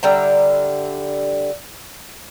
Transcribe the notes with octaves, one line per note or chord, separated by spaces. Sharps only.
D3 G3 E5 A#5